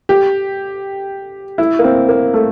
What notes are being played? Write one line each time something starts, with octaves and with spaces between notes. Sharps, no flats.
G4
E4
A#3
C4
A#3
A3